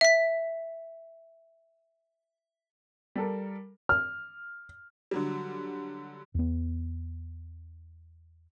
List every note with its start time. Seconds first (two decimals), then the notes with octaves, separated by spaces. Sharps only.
0.01 E5 B6
3.16 G3 A4 A#4
3.89 F6
5.11 D3 F#3 G3
6.34 E2 B3